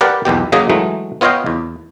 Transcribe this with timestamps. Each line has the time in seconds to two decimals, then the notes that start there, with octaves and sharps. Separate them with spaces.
0.01 G4 A#4 B4 D5 F#5 G5
0.25 B1 E2 B2 G4
0.52 C#3 F#3 A#3 G#4 D#5 G#5
0.69 E3 F#3 G#3 A3 D#4
1.21 B3 F4 C#5 D#5 F5 G5
1.46 E2